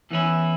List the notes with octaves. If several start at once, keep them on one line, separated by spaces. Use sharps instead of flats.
E2 E3 C#4 E4